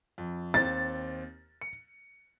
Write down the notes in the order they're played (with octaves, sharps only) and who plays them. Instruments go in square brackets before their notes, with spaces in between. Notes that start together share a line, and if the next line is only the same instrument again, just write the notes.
[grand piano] F2
[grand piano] D#2 C4 [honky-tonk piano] A6
[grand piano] C#7